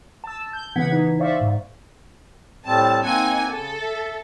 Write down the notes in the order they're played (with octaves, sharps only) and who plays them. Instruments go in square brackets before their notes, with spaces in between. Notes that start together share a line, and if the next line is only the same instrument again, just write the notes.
[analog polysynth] A5 E6
G6
C#3 E3 B3 F#5 G#6 B6
E3 D#4
C5 D5 E5 F5 C#6
G#2
[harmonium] A2 G3 C4 [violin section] A5
[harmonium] A#3 C4 F#5 [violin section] D#4 G#5 G#6
[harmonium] C#3 [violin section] A4
[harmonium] E5